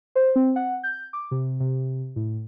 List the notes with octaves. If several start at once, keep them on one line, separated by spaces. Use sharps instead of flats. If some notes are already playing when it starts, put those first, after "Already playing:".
C5
C4
F#5
G6
D6
C3
C3
A2